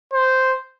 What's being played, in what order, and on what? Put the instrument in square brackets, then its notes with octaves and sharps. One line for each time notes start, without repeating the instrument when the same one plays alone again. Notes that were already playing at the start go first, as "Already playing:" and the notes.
[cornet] C5